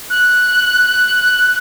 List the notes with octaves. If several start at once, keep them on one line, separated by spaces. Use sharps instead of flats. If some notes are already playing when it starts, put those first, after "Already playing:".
F#6